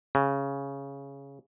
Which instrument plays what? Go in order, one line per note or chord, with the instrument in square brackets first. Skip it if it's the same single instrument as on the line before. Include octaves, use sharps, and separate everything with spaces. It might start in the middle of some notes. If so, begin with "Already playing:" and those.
[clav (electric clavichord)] C#3